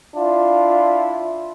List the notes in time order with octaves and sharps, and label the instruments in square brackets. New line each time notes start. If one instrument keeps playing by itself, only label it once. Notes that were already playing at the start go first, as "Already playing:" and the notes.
[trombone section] D4 E4 F4